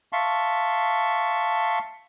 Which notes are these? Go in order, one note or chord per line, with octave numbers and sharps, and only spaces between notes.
E5 F5 A5 C6 C#6